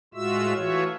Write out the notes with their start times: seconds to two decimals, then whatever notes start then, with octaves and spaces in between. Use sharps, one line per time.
0.14 A2 G#3 F4 F#4 E5 E6
0.55 E3 A3 F4 F#4 C#5 E5